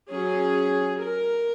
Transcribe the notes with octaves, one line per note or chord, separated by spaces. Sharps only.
F#3 C#4 G#4
A#4